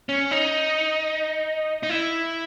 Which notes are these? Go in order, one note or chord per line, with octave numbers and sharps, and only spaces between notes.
C#4
D#4
D#4
E4